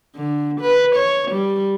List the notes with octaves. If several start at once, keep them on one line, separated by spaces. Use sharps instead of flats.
D3
B4
C#5
G3